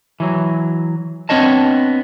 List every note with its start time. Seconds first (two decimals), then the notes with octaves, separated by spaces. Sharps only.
0.20 E3 F#3
1.29 B3 C4 D4 C#5 D#5 A5